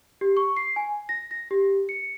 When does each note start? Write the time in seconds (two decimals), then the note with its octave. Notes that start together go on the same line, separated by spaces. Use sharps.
0.21 G4
0.37 C#6
0.57 C7
0.76 G#5
1.09 A#6
1.31 A#6
1.51 G4
1.89 C#7